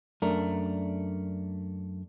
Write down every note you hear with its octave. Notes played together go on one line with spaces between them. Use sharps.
F#2 A3 D4 A#4